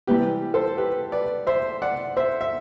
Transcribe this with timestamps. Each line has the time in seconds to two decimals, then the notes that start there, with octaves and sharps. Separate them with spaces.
0.07 C3 E3 G3 G4 B4
0.54 A4 C5
0.77 G4 B4
1.12 B4 D5
1.47 C5 E5
1.82 D5 F#5
2.17 C5 E5
2.41 E5